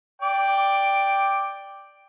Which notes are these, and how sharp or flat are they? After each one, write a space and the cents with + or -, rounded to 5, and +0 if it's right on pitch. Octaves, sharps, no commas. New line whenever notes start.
D5 +0 G5 +5 D6 +0